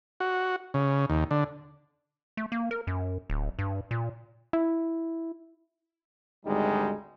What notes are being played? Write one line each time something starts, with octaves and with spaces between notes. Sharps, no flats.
F#4
C#3
D#2
D3
A3
A#3
A#4
F#2
D1
G2
A#2
E4
G#1 D2 G3 G#3 D#4